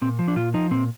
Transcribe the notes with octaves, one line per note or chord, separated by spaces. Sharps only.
A#2 C4
F3
D4
A#2 F4
F3 D#4
A#2 C4